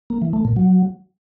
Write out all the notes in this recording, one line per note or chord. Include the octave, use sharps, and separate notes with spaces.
A#3
E3
A3
A#2
F#3